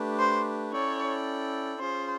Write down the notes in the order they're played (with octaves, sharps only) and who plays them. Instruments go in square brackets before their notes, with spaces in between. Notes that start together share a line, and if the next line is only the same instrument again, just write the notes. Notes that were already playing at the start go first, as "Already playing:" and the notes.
Already playing: [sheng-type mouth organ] A3 D4 G4 B4
[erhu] C5
[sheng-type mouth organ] C#4 E4 A4 D5 G5 [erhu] C#5
[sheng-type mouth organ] C#4 F4 G#4 [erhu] C5